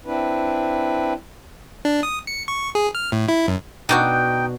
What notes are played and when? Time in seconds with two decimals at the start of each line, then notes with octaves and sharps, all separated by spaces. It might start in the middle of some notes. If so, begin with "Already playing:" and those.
0.06 C4 D4 E4 B4
1.85 D4
2.03 D#6
2.27 C#7
2.48 C#6
2.75 G#4
2.95 F6
3.12 A2
3.28 E4
3.48 F#2
3.89 B2 D4 D#4 F#4 G5 G6